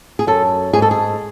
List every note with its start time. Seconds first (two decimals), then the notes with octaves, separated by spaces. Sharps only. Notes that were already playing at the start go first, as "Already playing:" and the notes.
0.19 G#4
0.27 F#2 A4
0.73 G#2 G#4
0.82 A4
0.91 G#4